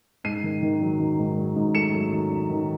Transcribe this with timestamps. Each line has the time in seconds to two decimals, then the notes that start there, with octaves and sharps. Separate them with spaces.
0.24 G#2 C7 D#7
0.43 D#3
0.62 D#3
0.81 F#3
1.00 D#3
1.19 G#2
1.38 F#3
1.56 G#2
1.75 A3 C#7 E7
1.94 F#3
2.12 D#3
2.31 F#3
2.49 D#3